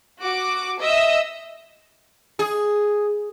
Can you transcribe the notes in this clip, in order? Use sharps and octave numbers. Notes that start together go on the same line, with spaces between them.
F#4 D6
D#5 E5 E6
G#4